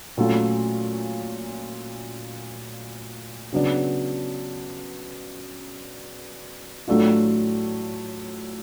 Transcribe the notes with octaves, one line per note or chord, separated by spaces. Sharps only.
A#2 F#3 A3 C#4 F4
C#3 F#3 B3 D4
A2 F#3 A3 D4 F4